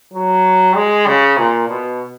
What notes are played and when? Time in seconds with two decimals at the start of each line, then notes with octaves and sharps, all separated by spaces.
0.13 F#3
0.75 G#3
1.06 C#3
1.38 A#2
1.68 B2